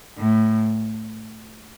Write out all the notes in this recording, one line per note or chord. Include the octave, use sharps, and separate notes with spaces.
A2